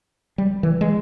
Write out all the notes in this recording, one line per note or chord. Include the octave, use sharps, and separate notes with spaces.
G3
E3
G#3